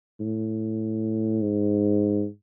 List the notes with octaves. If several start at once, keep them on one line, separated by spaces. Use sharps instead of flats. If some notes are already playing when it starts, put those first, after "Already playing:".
A2
G#2